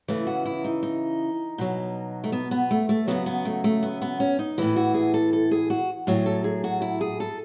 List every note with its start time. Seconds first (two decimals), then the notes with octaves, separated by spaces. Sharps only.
0.08 C#3 E3 A3
0.27 F#4
0.45 E4
0.64 D#4
0.83 D#4
1.58 B2 F#3
2.24 A3
2.32 B3
2.51 B3
2.71 A3
2.89 A3
3.08 C#3 F#3 B3
3.26 B3
3.45 A3
3.64 A3
3.83 B3
4.02 B3
4.20 C#4
4.39 D#4
4.58 A2 E3 E4
4.76 F#4
4.94 G#4
5.14 A4
5.33 A4
5.51 G#4
5.70 F#4
6.07 A2 F#3 G#4
6.26 A4
6.44 G#4
6.64 F#4
6.82 E4
7.01 G#4
7.20 A4